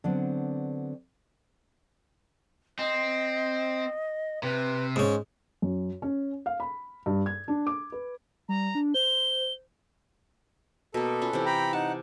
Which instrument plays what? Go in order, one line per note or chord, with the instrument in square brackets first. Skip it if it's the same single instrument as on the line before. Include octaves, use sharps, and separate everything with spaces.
[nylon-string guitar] D3 F#3 B3 C4 D4
[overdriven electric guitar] C4 [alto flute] D#5
[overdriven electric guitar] C3 [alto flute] B4
[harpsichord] G#2 C#4 [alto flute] G#3
[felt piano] F#2
C#4
F5
B5
G2
G#6
D4
D6
B4
[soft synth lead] G3 [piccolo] A#5
[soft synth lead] D4
[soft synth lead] C5 [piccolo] G7
[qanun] B2 A#3 [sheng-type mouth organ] A4
[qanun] C#4 F4 B4
C3 E3 E4
[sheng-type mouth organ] G5 A#5 B5
[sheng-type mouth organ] D#4 F#5 [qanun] A5